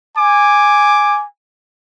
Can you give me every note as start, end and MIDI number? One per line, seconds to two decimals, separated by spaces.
0.17 1.25 80
0.17 1.25 86